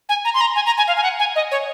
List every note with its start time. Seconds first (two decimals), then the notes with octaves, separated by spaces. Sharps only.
0.09 G#5
0.25 A#5
0.34 C6
0.41 A#5
0.56 G#5
0.66 A#5
0.78 G#5
0.88 F5
0.97 G#5
1.03 F#5
1.19 G#5
1.36 D#5
1.51 C#5